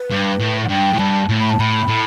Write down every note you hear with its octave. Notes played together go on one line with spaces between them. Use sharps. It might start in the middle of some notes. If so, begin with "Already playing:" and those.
Already playing: B4
G2
A2
F#5
G2 G5
A2
G2 A5
A2
B5
A5
A2 B5
A2